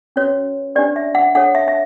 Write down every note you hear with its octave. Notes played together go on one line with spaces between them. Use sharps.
C#4 F#4 B4 C#5
D4 G4 B4 D5
E5
F#5
D4 A4 C#5 F#5
E5
E5